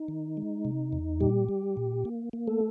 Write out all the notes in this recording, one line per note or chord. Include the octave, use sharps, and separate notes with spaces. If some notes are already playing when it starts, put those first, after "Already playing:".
Already playing: D#4
D#3
G#3
C3
E2
A#2 G3 G4
G3
A#2
A#3
A#3
A3 A4